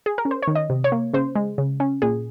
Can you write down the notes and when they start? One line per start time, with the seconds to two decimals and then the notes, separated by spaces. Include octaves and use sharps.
0.06 G#4
0.18 A#4
0.25 C#4
0.31 C5
0.42 D#3 C#5
0.55 D#5
0.70 C3
0.84 C#5
0.92 A#3
1.13 C#3 C5
1.35 G#3
1.58 C#3
1.80 C#4
2.02 A#2 G#4